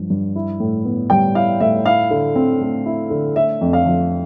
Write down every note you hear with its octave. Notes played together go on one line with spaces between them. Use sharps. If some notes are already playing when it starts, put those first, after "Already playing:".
Already playing: G2 F3
G2
E4
A2
B3
G3 G5
E4 F5
A2 E5
E4 F5
D3
C4
A3
E4
D3
A3 E5
F2
F5
F3